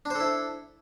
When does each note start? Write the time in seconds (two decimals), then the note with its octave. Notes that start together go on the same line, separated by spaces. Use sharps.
0.05 D4
0.10 C5
0.15 A4
0.20 E4